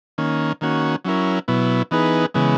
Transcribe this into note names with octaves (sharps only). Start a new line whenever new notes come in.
D#3 A#3 C#4
D#3 A#3 C#4 F#4
F#3 C#4 E4 A#4
B2 F#3 B3 E4
E3 B3 D#4 G#4 B4
C#3 E3 G#3 B3